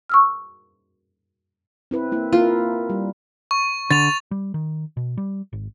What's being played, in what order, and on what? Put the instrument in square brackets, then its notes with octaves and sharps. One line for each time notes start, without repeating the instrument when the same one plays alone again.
[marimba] C#6 E6 F6
[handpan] C4 E4 B4
A#3 E4
[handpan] A#3 E4 A#4 [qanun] F4
[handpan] G3
[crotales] C#6
[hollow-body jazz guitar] D3 [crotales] A6 F7
[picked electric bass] G3
D#3
B2
G3
G#1